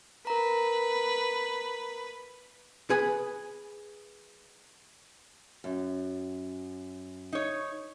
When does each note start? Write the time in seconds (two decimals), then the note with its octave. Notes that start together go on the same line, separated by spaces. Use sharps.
0.27 A#4 B4 A#5
2.90 G#4 B4 G#5
5.64 F#2
7.33 D#4 C#5